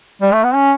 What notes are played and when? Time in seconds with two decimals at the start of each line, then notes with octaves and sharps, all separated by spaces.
0.21 G3
0.33 A3
0.44 B3
0.55 C#4